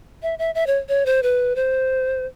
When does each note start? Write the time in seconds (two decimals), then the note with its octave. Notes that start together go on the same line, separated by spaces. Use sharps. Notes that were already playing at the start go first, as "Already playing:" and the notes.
0.22 E5
0.39 E5
0.55 E5
0.67 C#5
0.89 C#5
1.06 C5
1.23 B4
1.56 C5